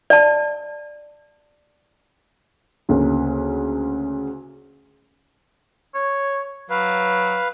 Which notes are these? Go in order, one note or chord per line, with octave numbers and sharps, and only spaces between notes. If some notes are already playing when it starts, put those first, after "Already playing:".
D5 A5
D2 C#3 A#3
C#5
F#3 B4 F5